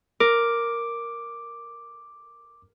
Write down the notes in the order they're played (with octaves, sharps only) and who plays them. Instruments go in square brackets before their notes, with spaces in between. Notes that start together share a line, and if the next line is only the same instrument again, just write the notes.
[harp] A#4 [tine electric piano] D6